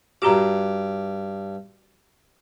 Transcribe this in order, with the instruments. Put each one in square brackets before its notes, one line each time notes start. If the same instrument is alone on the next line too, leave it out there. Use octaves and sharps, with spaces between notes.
[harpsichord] G2 D6 [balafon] F#4 G4 A#5